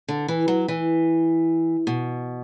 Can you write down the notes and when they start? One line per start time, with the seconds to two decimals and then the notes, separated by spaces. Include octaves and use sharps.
0.08 D3
0.28 E3
0.48 F#3
0.68 E3
1.87 B2